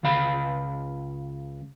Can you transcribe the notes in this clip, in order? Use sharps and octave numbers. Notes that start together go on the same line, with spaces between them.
C#2 C#3 F5 B5